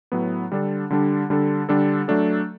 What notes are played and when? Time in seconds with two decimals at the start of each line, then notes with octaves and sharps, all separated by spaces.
0.12 A2 F#3 B3
0.52 D3 G3 D4 A4
0.90 D3 G3 D4 A4
1.30 D3 G3 D4 A4
1.69 D3 G3 D4 A4
2.08 F#3 A3 D4 A4